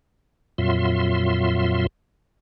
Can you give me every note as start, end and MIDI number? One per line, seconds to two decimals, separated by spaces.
0.58 1.87 41
0.58 1.87 46
0.58 1.87 54
0.58 1.87 65
0.58 1.87 76
0.58 1.87 84